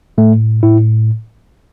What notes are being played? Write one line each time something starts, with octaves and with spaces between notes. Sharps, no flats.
A2 A3
A2 E4